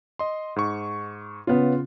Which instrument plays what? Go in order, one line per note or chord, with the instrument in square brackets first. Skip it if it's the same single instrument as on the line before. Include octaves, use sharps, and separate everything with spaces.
[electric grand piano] D#5 C6
G#2 C#6
[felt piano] C#3 B3 [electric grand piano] F4